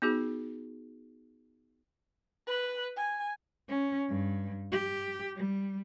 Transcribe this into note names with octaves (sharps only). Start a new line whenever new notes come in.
B3 D#4 F#4 G#4
B4
G#5
C#4
G2
G4
G3